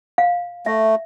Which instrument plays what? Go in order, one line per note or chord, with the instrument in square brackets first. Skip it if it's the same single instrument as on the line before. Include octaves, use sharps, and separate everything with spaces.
[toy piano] F5
[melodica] A3 [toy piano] E5